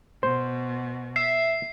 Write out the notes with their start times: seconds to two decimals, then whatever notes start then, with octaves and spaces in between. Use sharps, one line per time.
0.23 B2 C5
1.16 E5 C7